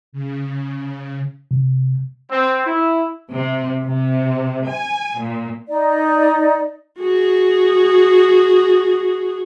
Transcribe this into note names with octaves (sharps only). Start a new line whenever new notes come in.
C#3
C3
C4
E4
C3
C3
G#5
A#2
D#4 D5
F#4 G#4